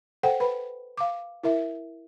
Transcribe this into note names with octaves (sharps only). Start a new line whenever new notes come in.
A4 C5 F#5 G5
B4 B5
F5 D6
E4 A#4 E5